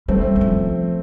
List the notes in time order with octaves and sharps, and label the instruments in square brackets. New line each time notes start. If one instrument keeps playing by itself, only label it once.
[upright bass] G3 [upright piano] A3 C4
[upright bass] G3
F3